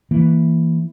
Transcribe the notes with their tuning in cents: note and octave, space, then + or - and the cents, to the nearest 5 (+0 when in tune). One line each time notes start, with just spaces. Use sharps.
E3 +0 A#3 -10